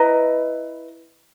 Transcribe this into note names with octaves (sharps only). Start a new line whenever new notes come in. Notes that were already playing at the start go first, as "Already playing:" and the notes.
Already playing: E4 B4 D#5 A#5